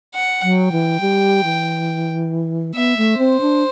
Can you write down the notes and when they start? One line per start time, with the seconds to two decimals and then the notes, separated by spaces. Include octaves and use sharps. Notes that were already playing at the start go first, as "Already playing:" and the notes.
0.14 F#5
0.43 F#3
0.57 G5
0.72 E3
1.01 G3
1.44 E3
2.75 B3 E5
2.97 A3
3.18 C4 C5
3.41 D4